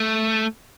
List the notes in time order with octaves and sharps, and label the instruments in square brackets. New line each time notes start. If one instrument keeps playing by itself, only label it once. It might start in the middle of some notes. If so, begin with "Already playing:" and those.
Already playing: [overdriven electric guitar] A3